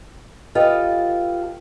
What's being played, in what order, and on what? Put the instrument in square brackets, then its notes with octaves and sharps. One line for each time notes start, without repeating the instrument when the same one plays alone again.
[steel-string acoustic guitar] F4 G4 A4 B4 D#5